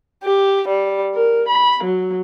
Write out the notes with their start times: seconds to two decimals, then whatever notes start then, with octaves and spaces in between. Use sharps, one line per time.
0.24 G4
0.68 G3
1.15 A#4
1.48 B5
1.84 F#3